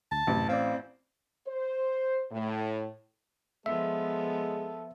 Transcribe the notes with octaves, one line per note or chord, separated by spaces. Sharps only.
D2 A5
A1 F#2 C3
C4 D5 F5
C5
A2
F3 G#3 B3 A4 E5